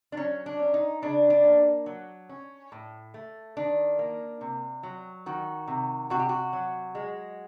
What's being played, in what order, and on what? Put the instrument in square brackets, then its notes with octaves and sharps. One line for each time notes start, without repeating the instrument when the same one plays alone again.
[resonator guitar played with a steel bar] D4
F#3 C#4
D4
C#4
D#4
C#3 D4
D4
A#3
F#3
C#4
A2
A3
D#3 D4
A#3
C3
F#3
D#3 F#4
C3
C3 F#4
G4
F#4
F#3
G#3